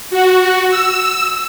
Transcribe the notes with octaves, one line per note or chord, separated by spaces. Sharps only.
F#4
E6